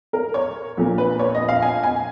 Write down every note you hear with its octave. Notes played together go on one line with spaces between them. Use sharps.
A#4
C#5
A#1 A#2 F3 A#3
B4
C#5
D#5
F5
G#5
G#5